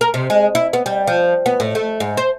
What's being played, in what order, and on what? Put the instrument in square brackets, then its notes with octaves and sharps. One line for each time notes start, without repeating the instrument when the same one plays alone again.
[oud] A#4
C3
G#3
E4
B3
G3
F3
B3
A2
A3
G#2
C5